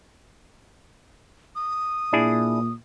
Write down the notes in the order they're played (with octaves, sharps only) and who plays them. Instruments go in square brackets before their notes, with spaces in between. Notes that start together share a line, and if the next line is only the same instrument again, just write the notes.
[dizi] D#6
[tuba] A#2 [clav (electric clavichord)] D4 E4 G#4